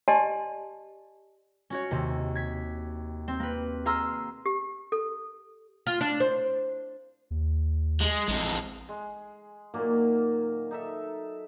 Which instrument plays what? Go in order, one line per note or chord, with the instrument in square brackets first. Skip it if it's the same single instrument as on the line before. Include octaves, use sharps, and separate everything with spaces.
[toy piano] G4 D5 D#5 G#5 A5 C6
[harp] C#4 F#4 C#5
D#2 C3
G#6 B6
C4
A#3 B4
G#4 F5 A#5 C6 E6 F6
[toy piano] G4
A4
[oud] F4
D4
C5
[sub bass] D#2
[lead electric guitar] G#3
[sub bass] A1 [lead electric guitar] F2 G#3
[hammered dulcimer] G#3
A#2 D#3 F#3 A#3
D#4 A4 E5